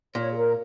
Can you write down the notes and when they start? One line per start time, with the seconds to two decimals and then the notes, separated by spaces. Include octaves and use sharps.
0.15 A#2 C#5
0.31 G#4
0.36 A#4